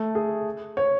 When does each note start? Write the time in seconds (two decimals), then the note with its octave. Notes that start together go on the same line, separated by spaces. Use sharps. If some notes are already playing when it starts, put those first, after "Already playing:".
Already playing: A3
0.15 G#4
0.77 C#5